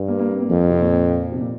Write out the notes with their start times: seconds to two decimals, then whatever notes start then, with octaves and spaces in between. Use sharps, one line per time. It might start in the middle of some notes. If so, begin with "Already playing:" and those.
Already playing: G2
0.08 A#3
0.19 A#3
0.30 C4
0.40 A#3
0.49 F2 F3
0.70 C3
0.81 A#2
1.32 C3
1.39 A#2